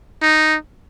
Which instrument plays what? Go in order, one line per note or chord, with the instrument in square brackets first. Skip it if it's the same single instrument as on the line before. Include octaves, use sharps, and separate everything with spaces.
[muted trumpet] D#4